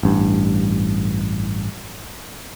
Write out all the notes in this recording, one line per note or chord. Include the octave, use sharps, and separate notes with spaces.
A1 G2